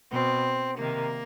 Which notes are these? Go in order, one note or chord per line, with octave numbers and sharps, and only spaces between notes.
B2 C4
C3 D#3 A#3